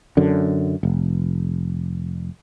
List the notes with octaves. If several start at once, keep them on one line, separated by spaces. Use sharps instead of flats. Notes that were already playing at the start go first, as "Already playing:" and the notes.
F#2 D3
F1